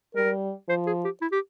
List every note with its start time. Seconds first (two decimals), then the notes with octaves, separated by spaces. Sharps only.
0.15 G3 A#4
0.69 F3 C5
0.87 G#4
1.04 G4
1.22 E4
1.32 G4